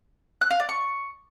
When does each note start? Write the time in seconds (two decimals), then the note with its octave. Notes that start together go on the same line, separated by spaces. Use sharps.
0.41 F#6
0.51 F5
0.60 D5
0.69 C#6